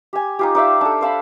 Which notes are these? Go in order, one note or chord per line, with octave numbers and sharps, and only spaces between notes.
G4 G#5
D#4 F4 G4
D#4 D5 E5 F5
D4 A4
C5 F5 A5 B5